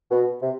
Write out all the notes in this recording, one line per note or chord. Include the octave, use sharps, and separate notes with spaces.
B2
C3